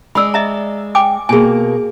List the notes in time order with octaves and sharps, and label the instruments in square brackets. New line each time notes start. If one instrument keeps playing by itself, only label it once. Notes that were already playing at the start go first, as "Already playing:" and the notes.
[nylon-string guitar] G#3 D5 [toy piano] B5 E6
[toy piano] D#5 E5 A#5
G5 G#5 D6
[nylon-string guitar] B2 A#3 [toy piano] G#4 G#5